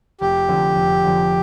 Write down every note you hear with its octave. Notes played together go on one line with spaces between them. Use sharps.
F1 G4
F2 D3
F1
F2 D3